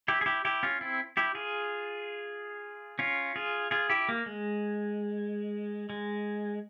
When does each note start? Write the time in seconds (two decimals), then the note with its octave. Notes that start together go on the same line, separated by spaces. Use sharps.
0.08 E4 G4
0.21 G#4
0.26 E4 G4
0.45 E4 G4
0.63 C#4 F4
0.81 C4 E4
1.17 E4 G4
1.35 F4 G#4
2.99 C#4 F4
3.36 F4 G#4
3.71 F4 G#4
3.90 E4 G4
4.09 A#3
4.26 G#3
5.90 G#3